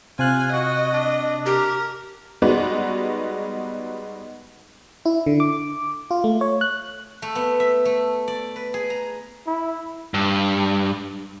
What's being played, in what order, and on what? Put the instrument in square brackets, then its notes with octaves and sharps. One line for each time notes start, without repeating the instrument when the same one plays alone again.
[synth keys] C3 F#6 [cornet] F4 [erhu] G#5
[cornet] F#4 [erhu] D#5
[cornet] D4
[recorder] G4 [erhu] A#4
[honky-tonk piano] G3 G#3 B3 D#4 F#4
[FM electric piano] E4
D3
D6
F4
A3
C#5
F#6
[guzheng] A3
B3
E5
A3
D5
B4
G#4
A#5
[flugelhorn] E4
[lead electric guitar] G2